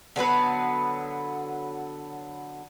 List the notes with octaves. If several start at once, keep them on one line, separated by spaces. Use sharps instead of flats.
D3 F#3 B3 B4